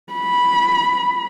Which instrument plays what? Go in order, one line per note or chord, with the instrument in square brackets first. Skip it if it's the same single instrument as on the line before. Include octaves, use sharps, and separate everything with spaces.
[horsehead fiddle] B5